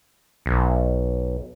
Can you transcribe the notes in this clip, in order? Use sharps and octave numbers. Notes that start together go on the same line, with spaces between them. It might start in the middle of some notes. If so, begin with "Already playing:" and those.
B1